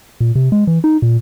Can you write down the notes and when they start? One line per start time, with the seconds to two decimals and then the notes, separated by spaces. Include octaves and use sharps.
0.21 A#2
0.35 C3
0.52 G#3
0.67 E3
0.84 D#4
1.02 A#2